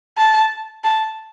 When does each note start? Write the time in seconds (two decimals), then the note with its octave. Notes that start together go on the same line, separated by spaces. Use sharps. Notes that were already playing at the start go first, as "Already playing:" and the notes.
0.18 A5
0.84 A5